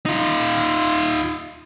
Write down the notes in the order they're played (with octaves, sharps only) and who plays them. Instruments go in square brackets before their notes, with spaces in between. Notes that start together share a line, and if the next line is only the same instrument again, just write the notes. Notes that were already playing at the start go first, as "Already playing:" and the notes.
[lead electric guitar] D#4 F4